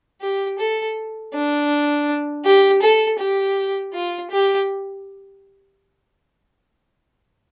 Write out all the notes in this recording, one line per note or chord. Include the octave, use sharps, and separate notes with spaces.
G4
A4
D4
G4
A4
G4
F4
G4